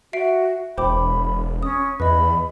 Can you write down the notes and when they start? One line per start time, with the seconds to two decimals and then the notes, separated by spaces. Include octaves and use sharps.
0.13 F#4 E5 C7 D7
0.78 E1 C5 G5 B5 D6
1.63 C#4 D#6
2.00 E2 B4 D#5 B5